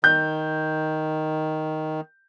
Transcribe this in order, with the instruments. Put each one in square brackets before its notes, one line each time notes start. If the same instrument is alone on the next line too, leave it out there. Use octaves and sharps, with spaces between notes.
[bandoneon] D#3 [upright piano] G6